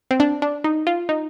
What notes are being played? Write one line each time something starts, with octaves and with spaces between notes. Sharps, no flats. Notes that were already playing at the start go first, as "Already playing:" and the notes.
C4
D4
D4
D#4
F4
D#4